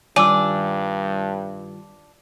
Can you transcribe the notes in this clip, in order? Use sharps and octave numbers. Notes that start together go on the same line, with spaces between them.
G2 D#3 G3 D4 F4 G#5 D6 E6